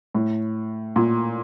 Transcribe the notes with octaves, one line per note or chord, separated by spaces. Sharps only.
A2
A#2